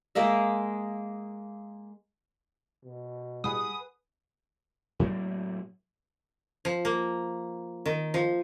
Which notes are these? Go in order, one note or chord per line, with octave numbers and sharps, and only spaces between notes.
G#3 A#3 D#5 E5
B2
A2 G3 G#4 B4 F#5 D#6
A2 F#3 A3 A#3
F3
A#3
D#3
F3